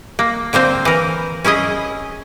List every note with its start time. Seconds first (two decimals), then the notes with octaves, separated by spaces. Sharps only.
0.19 A#3
0.53 D3 A#3 C4 C5
0.85 E3 A#4
1.44 C#4 E4 G#4 D#5